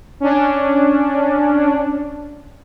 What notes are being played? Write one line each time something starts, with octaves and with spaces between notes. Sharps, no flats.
C#4 D4